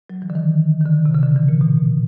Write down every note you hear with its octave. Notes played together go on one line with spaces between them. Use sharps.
F#3
E3
D3
D#3
D#3
D3
C3
C#3
D3
E3
A#2
B2